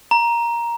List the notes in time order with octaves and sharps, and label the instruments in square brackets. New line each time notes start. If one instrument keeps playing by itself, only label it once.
[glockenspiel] A#5